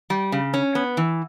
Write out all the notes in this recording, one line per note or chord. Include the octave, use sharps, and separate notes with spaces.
G3
C#3
C#4
B3
E3